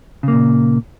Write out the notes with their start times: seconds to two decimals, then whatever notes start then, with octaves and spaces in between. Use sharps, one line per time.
0.23 C#3
0.28 A#3
0.33 A#2